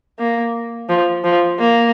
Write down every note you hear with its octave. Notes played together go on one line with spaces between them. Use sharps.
A#3
F3
F3
A#3